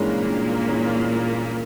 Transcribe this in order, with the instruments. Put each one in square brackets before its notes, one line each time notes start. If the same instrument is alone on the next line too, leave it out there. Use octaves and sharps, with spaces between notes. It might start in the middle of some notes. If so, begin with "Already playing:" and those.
Already playing: [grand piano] G2 E3 G#3 C#4 [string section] A#2 A#3
[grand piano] G2
E3 G#3 C#4